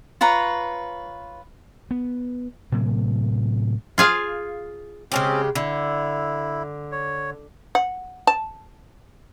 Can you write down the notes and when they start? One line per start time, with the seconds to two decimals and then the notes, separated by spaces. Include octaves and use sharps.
0.21 F4 B4 C#5 A#5
1.91 B3
2.72 A2 C3 F#3 A#3
3.98 F4 G#4 F5
5.12 C#3 G#3 C4 C#4 G4
5.55 D3 E4
6.92 C#5
7.75 F#5
8.27 A5